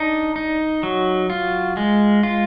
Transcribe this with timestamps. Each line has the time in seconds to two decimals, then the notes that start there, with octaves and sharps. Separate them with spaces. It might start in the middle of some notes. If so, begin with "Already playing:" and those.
Already playing: D4 D#4
0.36 D#4
0.83 F#3
1.30 F4
1.77 G#3
2.23 F4